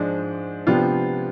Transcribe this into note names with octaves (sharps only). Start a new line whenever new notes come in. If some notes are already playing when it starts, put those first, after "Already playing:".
Already playing: G#2 F3 G#3 D4
C3 F3 B3 D4 F4